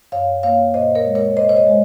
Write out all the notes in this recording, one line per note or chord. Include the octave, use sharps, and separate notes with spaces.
F#2 C#5 F5
A#3 C#5 F5
A#2 C5 D#5
A#4 C#5
G#3
A#4 C#5
C3 C5 D#5
C#5
C5 D#5
G#3